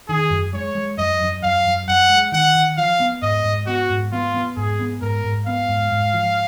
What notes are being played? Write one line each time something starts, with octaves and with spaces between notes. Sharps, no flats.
D#3 G#4
F#2
G#3 C#5
G#3
F#2 D#5
F#2
F#2 F5
F#2
F#2 F#5
G#3
D#3 F#5
D#3
F3 F5
B3
G#2 D#5
G#2
B3 F#4
G#2
B3 F4
B3
G#2 G#4
B3
G#2 A#4
G#2
B3 F5
G#2
G#2
F3